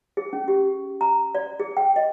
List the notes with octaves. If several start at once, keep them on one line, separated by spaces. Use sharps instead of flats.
G#4
C#4
G4
A#5
D5
G#4
G5
D#5